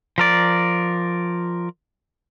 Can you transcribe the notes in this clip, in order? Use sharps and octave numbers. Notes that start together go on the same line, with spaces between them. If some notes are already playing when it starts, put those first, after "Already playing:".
F3 A#4 D5